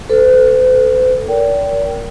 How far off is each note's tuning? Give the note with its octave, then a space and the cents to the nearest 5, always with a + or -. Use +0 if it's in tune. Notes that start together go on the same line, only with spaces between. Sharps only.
A4 +0 C5 -45
A#4 +0 D5 -40 G5 -10